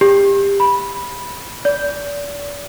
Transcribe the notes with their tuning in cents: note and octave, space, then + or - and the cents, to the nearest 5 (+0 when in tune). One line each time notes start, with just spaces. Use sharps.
G4 +20
B5 -10
D5 -35